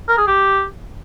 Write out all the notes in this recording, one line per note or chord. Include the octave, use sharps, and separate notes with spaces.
A#4
G#4
G4